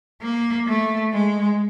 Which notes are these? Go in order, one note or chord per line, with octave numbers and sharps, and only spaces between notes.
A#3
A3
G#3